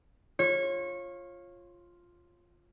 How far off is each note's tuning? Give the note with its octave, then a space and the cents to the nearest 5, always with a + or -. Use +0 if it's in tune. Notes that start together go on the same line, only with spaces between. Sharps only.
F4 +0 C#5 -25